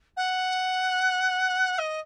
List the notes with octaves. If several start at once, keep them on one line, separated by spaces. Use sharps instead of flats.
F#5
D#5